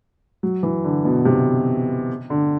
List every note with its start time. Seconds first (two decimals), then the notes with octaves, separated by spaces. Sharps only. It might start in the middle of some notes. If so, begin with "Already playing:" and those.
0.43 F#3
0.63 E3
0.84 D3
1.05 B2
1.25 C3
2.30 D3